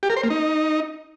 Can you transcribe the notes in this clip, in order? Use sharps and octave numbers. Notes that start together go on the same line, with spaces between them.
G4
A#4
C5
A#3
D#4